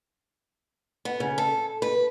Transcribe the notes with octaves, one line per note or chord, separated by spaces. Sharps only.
B3
C#3
A4
B4